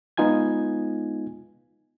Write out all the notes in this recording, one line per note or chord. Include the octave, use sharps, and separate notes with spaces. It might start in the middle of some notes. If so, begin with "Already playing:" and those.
G#3 B3 D#4 F4 G#5 G#6